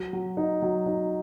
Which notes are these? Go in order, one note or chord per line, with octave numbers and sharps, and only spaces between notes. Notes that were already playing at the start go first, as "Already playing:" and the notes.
Already playing: F#3
F#3
D#4
F#3
D#4